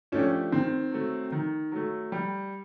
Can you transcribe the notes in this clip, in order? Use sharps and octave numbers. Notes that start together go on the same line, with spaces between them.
F3 A3 C#4 D4 G4
D#3 C4
F#3 A3
D#3
F#3 A3
G3